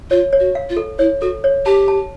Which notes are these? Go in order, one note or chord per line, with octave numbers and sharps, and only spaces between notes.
F4 C#5
C#5
F#4
F5
F4
A4
E4 C#5
F#4 A4
C#5
G4 A5
A5